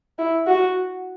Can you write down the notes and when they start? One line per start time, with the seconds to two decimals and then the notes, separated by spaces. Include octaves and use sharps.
0.18 E4
0.47 F#4